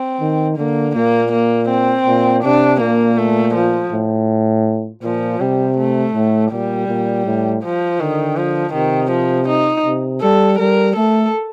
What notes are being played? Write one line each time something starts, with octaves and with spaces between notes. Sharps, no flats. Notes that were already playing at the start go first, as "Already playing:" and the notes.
Already playing: C4
D#3
D3 A#3
A#2 A#3
A#3
C4
A#2
C3 D4
A#2 A#3
A3
F3
A2
A#2 F3
C3 G3
A3
A2
A#2 G3
A#2
A2
F3
D3 D#3
F3
C3 D#3
F3
D#4
C3
G3 A4
G3 A#4
A3 A4